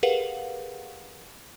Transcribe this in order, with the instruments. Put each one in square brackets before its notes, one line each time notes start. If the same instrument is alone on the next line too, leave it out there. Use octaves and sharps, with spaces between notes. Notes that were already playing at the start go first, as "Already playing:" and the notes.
[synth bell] G4 G#4 A#4 B4 F5 F#5